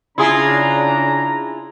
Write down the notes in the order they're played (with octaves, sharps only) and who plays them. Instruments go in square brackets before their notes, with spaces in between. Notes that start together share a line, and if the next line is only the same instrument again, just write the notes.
[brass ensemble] C#3 D4 A#5 [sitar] E4 F4 G#4